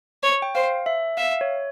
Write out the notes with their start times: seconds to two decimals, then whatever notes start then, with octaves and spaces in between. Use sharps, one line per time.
0.23 C#5
0.42 G5
0.55 C5 F5
0.86 E5
1.17 E5 F5
1.41 C#5